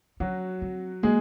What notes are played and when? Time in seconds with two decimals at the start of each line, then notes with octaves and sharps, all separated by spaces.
0.20 F#3 C#4 F#4
0.62 C4
1.03 G#3 A#3 G#4